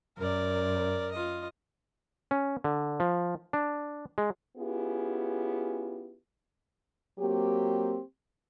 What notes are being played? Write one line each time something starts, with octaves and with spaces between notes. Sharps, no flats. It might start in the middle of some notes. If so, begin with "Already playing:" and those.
F#2 A#4 D5
F4 D#5
C#4
D3
F3
D4
G#3
B3 C#4 E4 F4 G4 G#4
F#3 A#3 C4 G4